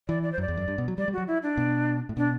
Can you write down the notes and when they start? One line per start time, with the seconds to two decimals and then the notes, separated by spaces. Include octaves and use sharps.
0.08 E3 D5
0.23 D5
0.32 C5
0.38 F#2
0.41 D5
0.48 E2
0.57 F#2
0.68 G2
0.78 B2
0.88 F#3
0.98 G3 D5
1.08 G3
1.13 F#3 F#4
1.27 E4
1.43 D4
1.57 B2
2.09 A2
2.17 B2 D4